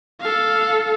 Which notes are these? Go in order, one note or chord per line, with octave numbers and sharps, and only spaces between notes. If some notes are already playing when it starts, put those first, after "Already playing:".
A4 F5